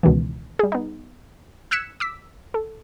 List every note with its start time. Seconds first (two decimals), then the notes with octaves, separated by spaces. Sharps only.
0.03 C#2 B2 D#3 E3
0.59 G3 G#4
0.72 B3 D#4
1.71 E6 F#6 G#6 B6 C#7 E7
2.00 D6 E6 B6
2.54 A4